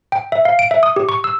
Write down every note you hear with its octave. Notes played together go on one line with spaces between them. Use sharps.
G5
E5
F5
D7
E5
D#6
G4
C#6
E6